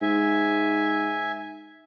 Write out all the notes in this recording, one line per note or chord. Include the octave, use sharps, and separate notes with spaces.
G#2 E5 G#5